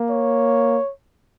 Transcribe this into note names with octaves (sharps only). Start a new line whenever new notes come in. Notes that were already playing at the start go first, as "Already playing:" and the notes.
Already playing: A#3
C#5